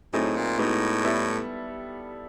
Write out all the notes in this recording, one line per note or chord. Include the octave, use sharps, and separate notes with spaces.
A2 F#3 A3 C4 D#4 G#4
A#2
A2 G#3 B3 D#4 F#4
G3 B3 E4 A4